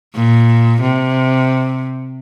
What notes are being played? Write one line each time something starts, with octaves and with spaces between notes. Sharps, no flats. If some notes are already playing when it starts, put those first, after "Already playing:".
A#2
C3